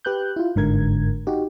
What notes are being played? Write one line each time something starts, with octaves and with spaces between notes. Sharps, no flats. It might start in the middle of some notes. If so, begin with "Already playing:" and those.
G4 B4 F#6 G6
E4 F4
G1 G#2 D3 A#4 G#6
D#4 F#4 G4